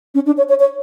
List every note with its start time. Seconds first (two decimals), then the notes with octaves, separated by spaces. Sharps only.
0.15 C#4
0.26 D4
0.38 C#5
0.49 C#5
0.60 C#5